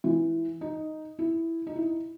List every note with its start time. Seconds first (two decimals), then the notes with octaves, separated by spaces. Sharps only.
0.04 E3
0.61 D#4
1.19 E4
1.67 D#4
1.76 E4